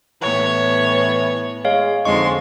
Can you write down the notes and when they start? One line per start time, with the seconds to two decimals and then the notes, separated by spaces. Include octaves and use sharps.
0.22 A2 E3 B3 C#5
1.65 G#3 C#5 F5
2.05 F2 D3 G#3 D#4 C6 C#6